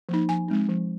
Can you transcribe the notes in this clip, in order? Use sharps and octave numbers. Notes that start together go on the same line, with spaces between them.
F3 A#3 D#4
F3 G#5
G#3 C4 D#4
F3